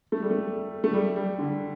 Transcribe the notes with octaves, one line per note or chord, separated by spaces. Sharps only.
A3
G3
A3
A3
G3
G3
D3